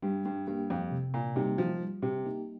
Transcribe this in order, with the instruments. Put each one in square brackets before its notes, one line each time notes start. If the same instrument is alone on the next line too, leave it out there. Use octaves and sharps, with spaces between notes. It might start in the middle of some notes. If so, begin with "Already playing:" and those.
[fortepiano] G2 [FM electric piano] G3
[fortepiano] G2
[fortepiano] G2 [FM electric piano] A#3 G4
[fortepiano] F2
[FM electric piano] C3
[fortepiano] A#2
[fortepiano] C3 [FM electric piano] G3 A#3 D#4
[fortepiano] F3
[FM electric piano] G3
[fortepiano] C3
[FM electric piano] A#3 D#4 G4